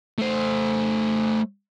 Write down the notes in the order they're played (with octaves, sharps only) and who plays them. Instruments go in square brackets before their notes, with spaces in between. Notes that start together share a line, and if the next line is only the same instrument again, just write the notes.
[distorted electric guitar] A3 C5